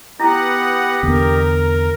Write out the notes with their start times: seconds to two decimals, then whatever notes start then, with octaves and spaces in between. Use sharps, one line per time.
0.20 B3 E4 G4 D#5 F#5
1.03 E2 D3 B3 A#4